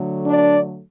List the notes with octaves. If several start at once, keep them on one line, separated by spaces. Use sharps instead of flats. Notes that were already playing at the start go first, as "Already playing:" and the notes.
Already playing: D3 F#3 A3
D4 D5